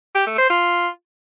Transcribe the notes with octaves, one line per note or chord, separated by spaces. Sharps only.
G4
A3
C5
F4